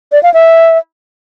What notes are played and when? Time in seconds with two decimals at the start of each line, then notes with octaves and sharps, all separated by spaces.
0.12 D5
0.23 F5
0.34 E5